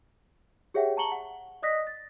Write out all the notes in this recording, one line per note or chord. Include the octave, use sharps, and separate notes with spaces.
G4 G#4 C#5 E5 F#5 G5
A5 A#5 C#6 C#7 F#7 G7
F#5
D5 D#5 D#6 F#6 A#6 B6
A6